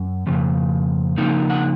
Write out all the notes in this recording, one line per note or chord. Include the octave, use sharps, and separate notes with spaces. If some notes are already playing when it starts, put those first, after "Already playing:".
Already playing: F#2
F2 C#3
C#3 F3 A#3 D#4
F#5